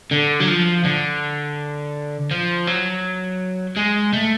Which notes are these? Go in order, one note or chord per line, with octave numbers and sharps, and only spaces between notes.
D3
F#3
F3
D3
F3
F#3
G#3
A3